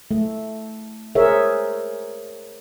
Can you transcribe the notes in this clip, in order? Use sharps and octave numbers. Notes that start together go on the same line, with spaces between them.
A3
G#4 A#4 C5 C#5 E5